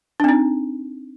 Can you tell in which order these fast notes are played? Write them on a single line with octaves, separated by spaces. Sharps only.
D4 C4 D#4